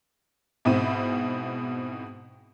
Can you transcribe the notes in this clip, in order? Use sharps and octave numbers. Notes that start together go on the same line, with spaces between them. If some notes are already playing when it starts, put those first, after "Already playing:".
G#2 B2 C4 E4 B5 D#7